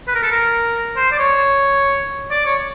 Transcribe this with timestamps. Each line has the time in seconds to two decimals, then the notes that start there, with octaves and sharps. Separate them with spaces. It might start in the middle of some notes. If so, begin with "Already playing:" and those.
0.08 B4
0.15 A#4
0.23 A4
0.32 A#4
0.96 C5
1.12 D5
1.19 C#5
2.31 D5
2.45 C#5